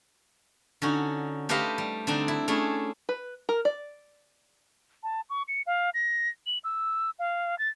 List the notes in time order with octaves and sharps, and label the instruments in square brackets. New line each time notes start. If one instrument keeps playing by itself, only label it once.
[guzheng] D3 C#4 D#4 F#4
A3 G4 B4 C5 D#5 F5
G3
D3 C4 D4 D#4
E4
A3 C#4 D4 E4 G#4
[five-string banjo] B4
A#4
D5
[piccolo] A5
C#6
C#7
F5
A#6
F#7
E6
F5
A6